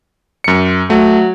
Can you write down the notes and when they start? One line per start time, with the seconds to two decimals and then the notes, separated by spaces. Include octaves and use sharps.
0.44 F#2 C#7
0.90 F#3 A3